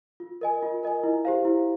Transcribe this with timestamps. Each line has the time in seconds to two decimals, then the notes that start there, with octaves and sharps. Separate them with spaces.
0.20 F4
0.41 A#4 D#5 G#5
0.62 F4
0.83 A#4 D#5 G#5
1.03 E4
1.25 G4 C5 F5
1.45 E4